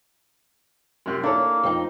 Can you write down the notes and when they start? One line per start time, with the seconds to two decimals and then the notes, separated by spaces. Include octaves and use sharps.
1.06 F#2 C3
1.23 A#3 D4 E4 A4 C#5
1.63 F2 C4 D#4